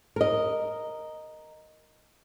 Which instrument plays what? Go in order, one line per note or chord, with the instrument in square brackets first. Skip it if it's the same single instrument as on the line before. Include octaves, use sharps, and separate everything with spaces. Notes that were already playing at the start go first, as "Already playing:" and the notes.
[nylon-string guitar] A#4 D#5